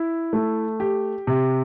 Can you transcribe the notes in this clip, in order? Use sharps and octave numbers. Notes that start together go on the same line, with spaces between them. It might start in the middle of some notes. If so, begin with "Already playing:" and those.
Already playing: E4
A3
G4
C3